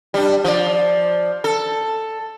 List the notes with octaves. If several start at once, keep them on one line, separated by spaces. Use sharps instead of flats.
G3 D4
F3 D5
A4